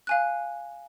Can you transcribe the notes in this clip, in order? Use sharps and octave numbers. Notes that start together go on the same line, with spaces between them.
F5 G#5 F#6